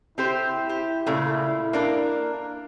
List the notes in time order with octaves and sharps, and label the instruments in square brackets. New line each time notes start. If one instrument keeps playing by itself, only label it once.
[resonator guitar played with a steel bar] C4 G4 C5 [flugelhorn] E4
[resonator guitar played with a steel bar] G4
A#2 C#3 A3
A#3 D4 A#4